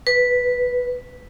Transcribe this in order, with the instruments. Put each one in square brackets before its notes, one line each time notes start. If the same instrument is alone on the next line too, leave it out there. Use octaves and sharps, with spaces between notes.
[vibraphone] B4